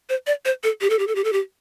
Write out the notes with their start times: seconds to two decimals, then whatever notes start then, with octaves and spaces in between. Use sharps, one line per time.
0.09 C5
0.27 D5
0.45 C5
0.64 A4
0.81 G4
0.90 A4
0.99 G4
1.07 A4
1.15 G4
1.24 A4
1.33 G4